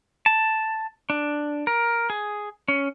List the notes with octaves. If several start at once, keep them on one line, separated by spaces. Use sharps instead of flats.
A5
D4
A#4
G#4
C#4